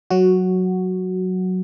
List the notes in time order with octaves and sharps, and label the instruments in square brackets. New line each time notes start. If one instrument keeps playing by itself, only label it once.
[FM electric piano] F#3 F#4